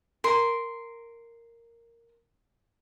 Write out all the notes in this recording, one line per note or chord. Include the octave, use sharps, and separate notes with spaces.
A#4 C6